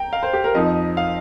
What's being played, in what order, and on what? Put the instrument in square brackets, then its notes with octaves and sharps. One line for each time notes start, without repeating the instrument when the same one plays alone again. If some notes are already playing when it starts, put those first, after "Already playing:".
Already playing: [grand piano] G5 A#5
F5
C5
G4
A#4
F2 F3 D#4 D#5
F5